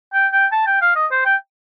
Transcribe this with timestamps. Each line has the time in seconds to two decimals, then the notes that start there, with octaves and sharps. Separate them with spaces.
0.13 G5
0.32 G5
0.52 A5
0.66 G5
0.81 F5
0.96 D#5
1.11 C5
1.25 G5